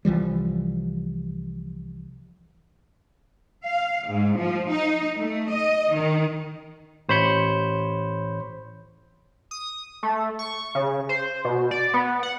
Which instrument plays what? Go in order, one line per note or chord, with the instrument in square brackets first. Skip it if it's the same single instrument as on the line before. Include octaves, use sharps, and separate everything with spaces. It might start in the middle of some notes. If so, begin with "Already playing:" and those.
[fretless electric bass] C2 E3 F3 G3
[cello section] F5
G#2
F3
D#4
A3
D#5
D#3
[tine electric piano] A1 C5 C#5 B5 G6 C#7
[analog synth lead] D#6
A3
C#6
C#3
C5
B2
D5
B3
F#5